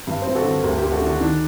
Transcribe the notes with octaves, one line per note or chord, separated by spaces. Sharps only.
G2
G2 C4
F#4 A4
D3
D2 G4 A#4
G4 A#4
D2
F#4 A4
D3
D4 F#4
D#3 D4